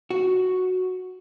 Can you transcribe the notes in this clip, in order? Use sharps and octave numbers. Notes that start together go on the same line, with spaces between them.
F#4